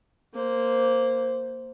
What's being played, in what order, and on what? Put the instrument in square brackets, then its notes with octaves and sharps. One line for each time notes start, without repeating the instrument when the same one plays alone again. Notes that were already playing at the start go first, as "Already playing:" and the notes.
[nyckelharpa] A#3 C5